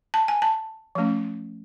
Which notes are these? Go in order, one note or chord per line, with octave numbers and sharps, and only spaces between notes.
A5
G#5
A5
F3 A3 C#4